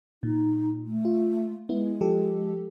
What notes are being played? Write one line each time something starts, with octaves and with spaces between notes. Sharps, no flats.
A#2 D#4
A3
F4
G#3 B3 E4
F3 G4 A4